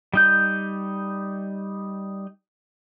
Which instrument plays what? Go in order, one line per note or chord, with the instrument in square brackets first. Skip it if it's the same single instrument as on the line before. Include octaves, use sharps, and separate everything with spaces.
[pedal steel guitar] G3 D#4 G6